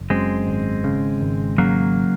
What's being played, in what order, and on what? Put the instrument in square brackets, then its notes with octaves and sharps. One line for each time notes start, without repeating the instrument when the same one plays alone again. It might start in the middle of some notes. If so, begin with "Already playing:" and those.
Already playing: [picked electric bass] F#1
[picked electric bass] F#2 [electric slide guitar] G#3 C4
[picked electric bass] G#1
C#3
G#1
[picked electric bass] C#3 [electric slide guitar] F#3 A#3